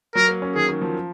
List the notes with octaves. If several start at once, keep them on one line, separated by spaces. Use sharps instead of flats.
F#3 A#4
A#3
C#4
D#3 G#4
D#3
F3